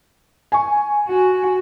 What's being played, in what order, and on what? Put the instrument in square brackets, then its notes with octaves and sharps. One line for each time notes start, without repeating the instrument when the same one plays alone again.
[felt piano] G#5 C#6
[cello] F#4